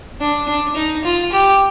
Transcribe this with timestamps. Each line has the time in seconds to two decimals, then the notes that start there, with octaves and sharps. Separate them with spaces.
0.21 D4
0.48 D4
0.76 D#4
1.04 F4
1.32 G4